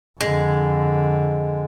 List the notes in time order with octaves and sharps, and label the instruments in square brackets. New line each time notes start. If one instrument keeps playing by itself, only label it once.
[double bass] F2 D3 [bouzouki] G#3